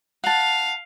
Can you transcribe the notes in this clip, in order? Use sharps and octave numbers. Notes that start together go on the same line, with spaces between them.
F5 F#5 A5